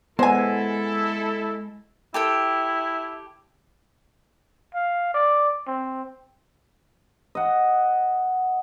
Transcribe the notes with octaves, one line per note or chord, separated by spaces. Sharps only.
G#3 B3 E4 A4 C5 G#5
E4 G4 A4 G5
F5
D5
C4
D#5 F#5